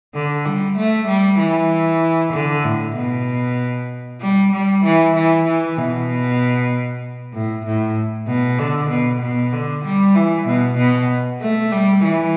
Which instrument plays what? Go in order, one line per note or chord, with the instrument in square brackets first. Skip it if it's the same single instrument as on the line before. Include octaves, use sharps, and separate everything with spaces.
[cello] D3
G3
A3
G3
E3
D3
A2
B2
G3
G3
E3
E3
E3
B2
A2
A2
B2
D3
B2
B2
D3
G3
E3
B2
B2
A3
G3
E3